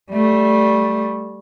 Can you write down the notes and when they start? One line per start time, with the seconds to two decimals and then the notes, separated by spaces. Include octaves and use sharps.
0.12 G3 A3